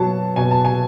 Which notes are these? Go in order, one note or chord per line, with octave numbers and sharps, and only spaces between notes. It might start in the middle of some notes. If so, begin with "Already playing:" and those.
Already playing: B2 F#3 A5
B2 G#5
A5
G#5